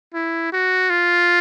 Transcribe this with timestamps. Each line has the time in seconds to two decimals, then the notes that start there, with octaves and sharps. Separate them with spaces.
0.14 E4
0.52 F#4
0.90 F4